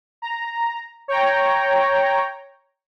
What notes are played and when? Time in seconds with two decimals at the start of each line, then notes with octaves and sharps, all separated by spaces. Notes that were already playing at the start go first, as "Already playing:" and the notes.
0.22 A#5
1.08 C#5 G5 A#5